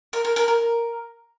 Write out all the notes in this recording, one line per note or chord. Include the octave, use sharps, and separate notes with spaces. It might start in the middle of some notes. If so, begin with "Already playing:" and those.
A#4
A#4
A#4
A#4